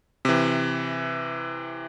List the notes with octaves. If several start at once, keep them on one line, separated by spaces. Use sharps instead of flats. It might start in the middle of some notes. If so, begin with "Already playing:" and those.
C3 E3